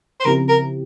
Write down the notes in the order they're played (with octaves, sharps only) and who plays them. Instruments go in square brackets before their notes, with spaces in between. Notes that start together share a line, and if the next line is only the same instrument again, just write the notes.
[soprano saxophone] C5
[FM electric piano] C#3 F3 C4 E4 G4 [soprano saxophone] A#4
[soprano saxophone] A#4